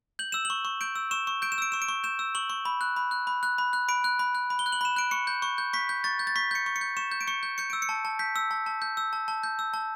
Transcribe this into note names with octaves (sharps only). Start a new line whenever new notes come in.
G6 F#7
E6 E7
F#7
C#6
C#6
G6 D7
E6
C#6 E7
C#6
G6 D7
E7
E6 D7
C#6 E7
D7
C#6
G6 E7
E6
C#6 F#7
C#6
B5
F#6
B5
F#6
B5
F#6
B5
F#6
B5 D7
F#6
B5
F#6
B5
G7
F#6
F#7
B5 E7
F#6 D7
C#6 C#7
G6
C#6
G6
C#6 B6
G6
C#6 A6
G6
A6
C#6 B6
G6 C#7
C#6
C#7
G6
C#6 E7
G6
D7
C#6 C#7
G6
G6 C#7
E6 D7
C#7
A5
A5
G6 B6
E6
A5
A5
G6
E6
A5
A5
G6
E6
A5